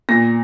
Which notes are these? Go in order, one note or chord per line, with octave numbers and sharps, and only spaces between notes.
A#2 A#6